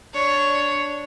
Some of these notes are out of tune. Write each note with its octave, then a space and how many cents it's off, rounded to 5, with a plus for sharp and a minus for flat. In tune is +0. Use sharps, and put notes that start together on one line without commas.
D4 -5 C#5 +5